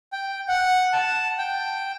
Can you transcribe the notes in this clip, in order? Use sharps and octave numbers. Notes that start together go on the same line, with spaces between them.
G5
F#5
A5
G5